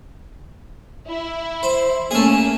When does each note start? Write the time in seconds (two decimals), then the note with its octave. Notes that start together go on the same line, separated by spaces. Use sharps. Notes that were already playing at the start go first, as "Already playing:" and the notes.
1.07 E4
1.63 C5
2.11 A3 A#3 C#4 G#4